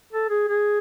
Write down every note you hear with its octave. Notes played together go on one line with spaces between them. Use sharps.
A4
G#4
G#4